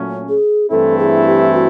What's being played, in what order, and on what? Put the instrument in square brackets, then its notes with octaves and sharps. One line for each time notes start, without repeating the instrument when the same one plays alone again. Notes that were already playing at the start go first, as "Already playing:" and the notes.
Already playing: [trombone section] A#2 F#3 A3 C#4
[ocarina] G#4
[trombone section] G2 E3 A3 C4 E4 [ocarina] A4
[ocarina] G#4
G4
F#4